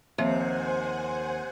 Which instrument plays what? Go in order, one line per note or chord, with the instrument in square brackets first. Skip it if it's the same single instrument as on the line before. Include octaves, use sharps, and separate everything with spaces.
[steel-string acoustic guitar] D#2 [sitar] C3 [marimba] F3 C4 E5 [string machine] C5 F#5 G#5